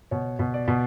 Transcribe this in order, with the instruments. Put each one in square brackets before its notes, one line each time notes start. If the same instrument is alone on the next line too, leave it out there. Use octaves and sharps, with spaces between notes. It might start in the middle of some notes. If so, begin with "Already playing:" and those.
[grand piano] B2 C#5
B2
D5
B2